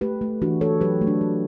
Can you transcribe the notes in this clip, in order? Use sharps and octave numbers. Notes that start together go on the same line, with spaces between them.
A3 G4 B4
A3
E3 D4 F#4
A3 A4 C#5
F#3 G4 B4
A3
D4
A3